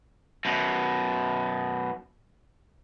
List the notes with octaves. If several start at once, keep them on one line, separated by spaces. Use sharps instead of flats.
F#2 B2